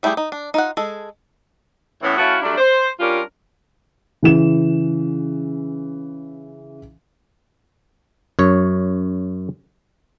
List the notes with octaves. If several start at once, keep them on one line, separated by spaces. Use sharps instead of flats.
G3 A3 E4 G4 G#4
D#4
D4
D#4 F4 F#5
G#3 G#4 A4
A2 E3 B3 C#4 E4
A3 C#4 E4 F#4 F5
F#3 G3 A3 D4
C5
G3 C#4 D4 F4 A#4
C#3 E3 E7
F#2 C#5